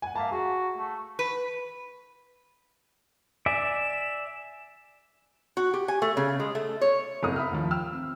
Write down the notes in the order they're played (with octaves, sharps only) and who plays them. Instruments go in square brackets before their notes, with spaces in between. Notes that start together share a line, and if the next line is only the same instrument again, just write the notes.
[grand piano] F#5 G#5
[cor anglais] A#3 [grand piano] E5 F5 A5
[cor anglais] F#4 [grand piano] G#4
[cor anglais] A3
[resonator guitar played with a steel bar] B4
[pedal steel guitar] D5 E5 [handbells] G#5 B6 [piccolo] E7
[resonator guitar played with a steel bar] F#4
G4
G#5
A3
C#3
G#3
A3
C#5
[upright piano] F#1 C4 E4 A#4 A#5 D#6
E5 B5 F6
D#2 F3
G5 E6 F6
C4